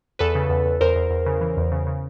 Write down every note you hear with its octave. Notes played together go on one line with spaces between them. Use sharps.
E2 A4 B4
C#3
E2
E2
E2 A#4 C5
E2
E2
C#3
E3
E2
C#3
C#3